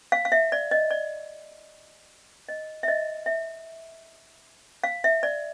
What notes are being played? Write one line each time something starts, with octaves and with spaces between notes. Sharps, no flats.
F5
F5
E5
D5
D#5
D5
D#5
E5
D#5
E5
F5
E5
D5